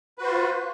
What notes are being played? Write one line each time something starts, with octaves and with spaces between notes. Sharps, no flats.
F4 F#4 B4 C5